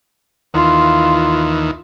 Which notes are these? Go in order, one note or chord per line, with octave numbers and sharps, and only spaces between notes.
D#2 D#3 E3 F4